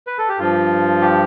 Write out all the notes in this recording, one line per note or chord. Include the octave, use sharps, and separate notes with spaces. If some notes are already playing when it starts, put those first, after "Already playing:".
B4
A4
G4
G2 F3 F4
G4